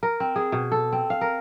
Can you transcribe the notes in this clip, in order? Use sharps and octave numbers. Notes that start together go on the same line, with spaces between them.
A#4
C4
G#4
B2
A4
C4
F5
A#4